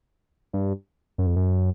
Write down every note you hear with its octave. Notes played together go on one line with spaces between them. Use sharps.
G2
F#2
F2
F#2